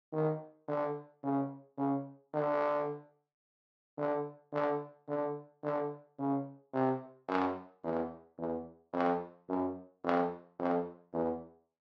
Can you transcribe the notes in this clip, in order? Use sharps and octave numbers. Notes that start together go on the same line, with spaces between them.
D#3
D3
C#3
C#3
D3
D3
D3
D3
D3
C#3
C3
F#2
E2
E2
F2
F#2
F2
F2
E2